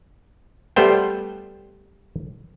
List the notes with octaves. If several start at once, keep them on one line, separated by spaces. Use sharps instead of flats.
G3 A3 B3 C5 G5